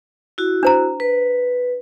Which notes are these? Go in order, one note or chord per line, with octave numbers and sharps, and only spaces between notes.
E4 F#4
D4 C5 A#5
B4